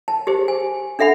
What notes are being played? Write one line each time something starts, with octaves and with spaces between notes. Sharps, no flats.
A5
G4 G#4 C5
G#5
D4 A4 E5 F#5 B5